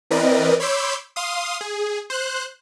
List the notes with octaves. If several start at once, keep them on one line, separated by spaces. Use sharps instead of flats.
E3 C4 A#4 B4 D5 D#5
C#5 B5 C6 D6 E6 G6
F5 C6 D#6
G#4
C5 F#6